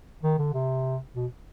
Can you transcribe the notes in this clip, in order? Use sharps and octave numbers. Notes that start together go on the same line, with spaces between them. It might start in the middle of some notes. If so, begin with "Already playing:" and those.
D#3
D3
C3
B2